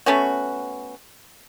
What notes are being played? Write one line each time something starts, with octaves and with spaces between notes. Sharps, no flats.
A3 B3 C#4 F#4